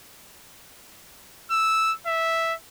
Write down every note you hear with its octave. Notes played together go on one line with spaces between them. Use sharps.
E6
E5